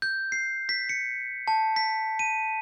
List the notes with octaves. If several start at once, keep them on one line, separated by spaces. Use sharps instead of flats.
G6
C7
B6
C#7
A5
B6
D#7